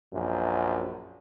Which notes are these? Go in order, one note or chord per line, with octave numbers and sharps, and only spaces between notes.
A#1 F#2